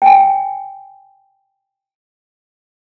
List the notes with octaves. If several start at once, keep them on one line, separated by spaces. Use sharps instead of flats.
G5 G#5